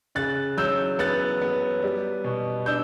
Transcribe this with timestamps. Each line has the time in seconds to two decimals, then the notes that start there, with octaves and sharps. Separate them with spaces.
0.15 C#3 F#6 A6
0.57 F#3 E6 G6
0.99 B3 F#6 A6
1.42 B3
1.82 G3
2.24 B2
2.66 D4 E6 G6